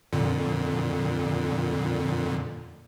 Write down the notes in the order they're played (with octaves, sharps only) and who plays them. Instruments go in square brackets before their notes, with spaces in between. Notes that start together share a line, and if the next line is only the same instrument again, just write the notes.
[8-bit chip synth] F2 A#2 D3